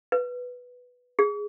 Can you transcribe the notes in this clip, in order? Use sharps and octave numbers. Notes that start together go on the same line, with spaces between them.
B4
G#4